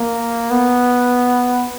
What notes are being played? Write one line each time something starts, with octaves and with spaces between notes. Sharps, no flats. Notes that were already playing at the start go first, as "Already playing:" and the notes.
Already playing: A#3
B3